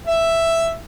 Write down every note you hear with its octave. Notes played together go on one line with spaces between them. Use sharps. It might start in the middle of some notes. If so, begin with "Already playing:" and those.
E5